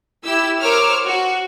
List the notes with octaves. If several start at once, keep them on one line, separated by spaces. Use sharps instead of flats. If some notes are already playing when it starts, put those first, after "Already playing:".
E4 G4 E6
A#4 C5 C#5 D6 E6 F6
F#4